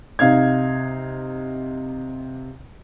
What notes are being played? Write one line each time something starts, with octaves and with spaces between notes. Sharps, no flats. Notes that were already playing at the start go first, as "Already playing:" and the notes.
C3 D#4 F5 G#6